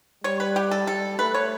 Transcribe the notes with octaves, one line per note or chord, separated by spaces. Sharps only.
G3 C#5
B4
G4
A4
G3 A4
A3 B4
C#5